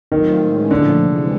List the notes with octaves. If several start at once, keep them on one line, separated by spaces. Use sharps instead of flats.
D#3 F#3 A3 C4 F4
A2 E3 G#3 C#4
A#2 D3 F3 A3
C3 E3 G#3